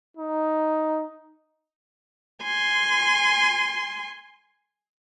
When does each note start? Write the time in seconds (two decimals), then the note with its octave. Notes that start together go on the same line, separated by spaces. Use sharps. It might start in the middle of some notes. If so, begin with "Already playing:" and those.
0.17 D#4
2.43 G#5 C6